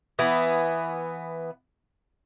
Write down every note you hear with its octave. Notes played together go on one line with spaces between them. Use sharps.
E3 B3